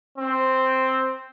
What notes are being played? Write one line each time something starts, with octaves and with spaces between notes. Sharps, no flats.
C4